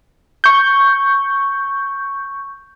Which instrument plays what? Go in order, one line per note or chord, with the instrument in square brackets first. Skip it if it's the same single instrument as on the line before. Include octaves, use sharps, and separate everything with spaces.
[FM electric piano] C#6 G6